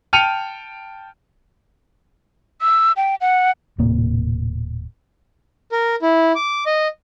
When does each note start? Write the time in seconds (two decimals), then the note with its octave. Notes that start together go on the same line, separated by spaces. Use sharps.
0.13 G5 A5 F6 C#7 D#7 F7
2.61 E6
2.97 G5
3.21 F#5
3.78 D#1 A2 C3 A#3
5.72 A#4
6.02 E4
6.35 D6
6.66 D#5